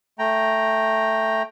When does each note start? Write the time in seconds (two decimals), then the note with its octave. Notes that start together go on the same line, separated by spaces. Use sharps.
0.19 A3 G5 A#5